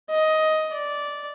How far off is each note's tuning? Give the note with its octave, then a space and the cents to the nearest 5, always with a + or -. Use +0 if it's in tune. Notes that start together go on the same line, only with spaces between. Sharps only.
D#5 +10
D5 -10